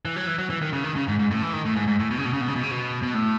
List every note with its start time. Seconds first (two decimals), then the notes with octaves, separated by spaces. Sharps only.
0.05 E3
0.16 F#3
0.27 E3
0.38 F#3
0.50 E3
0.62 D#3
0.73 C#3
0.84 D#3
0.96 C#3
1.08 G#2
1.19 G#2
1.31 A2
1.42 E3
1.53 D#3
1.65 A2
1.76 G#2
1.88 G#2
2.00 A2
2.11 B2
2.18 C#3
2.25 B2
2.33 C#3
2.41 B2
2.48 C#3
2.56 B2
2.63 C#3
2.71 B2
3.03 B2
3.14 A2